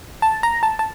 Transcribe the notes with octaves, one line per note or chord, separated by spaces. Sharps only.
A5
A#5
A5
A5